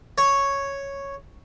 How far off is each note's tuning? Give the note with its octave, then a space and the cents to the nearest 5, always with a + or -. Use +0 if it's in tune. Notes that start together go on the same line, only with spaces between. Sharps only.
C#5 +0